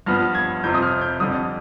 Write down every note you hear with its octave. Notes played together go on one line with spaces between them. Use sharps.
G2 F3 B3 F6
G#6
F2 C3 F3 C4 G6
D#6
F6
G6
F2 D3 G3 D#6